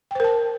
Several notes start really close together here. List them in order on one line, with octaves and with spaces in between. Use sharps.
G5 C5 A#4 A5